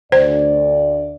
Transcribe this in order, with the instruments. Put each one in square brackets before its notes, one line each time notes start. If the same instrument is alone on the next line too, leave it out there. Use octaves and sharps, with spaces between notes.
[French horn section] D2 D5 [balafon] C5